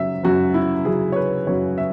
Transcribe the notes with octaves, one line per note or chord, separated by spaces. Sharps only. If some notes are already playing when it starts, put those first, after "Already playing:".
Already playing: F#2 C#3 F#3 E5
F#2 C#3 F#3 F#4
E4
F#2 C#3 F#3 G#4
C#5
B4
F#2 C#3 F#3 C#5
E5